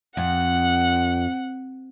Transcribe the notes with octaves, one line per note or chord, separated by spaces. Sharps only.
F2 F#5